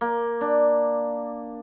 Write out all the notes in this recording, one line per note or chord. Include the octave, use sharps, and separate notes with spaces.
A#3
D4